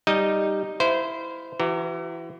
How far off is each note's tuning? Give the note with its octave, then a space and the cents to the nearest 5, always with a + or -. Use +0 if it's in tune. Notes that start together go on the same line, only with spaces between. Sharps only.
G3 +0 D#4 +0 D#5 +0
E4 +0 C5 -20 F5 +0
E3 +25 F#4 +45 A#5 -20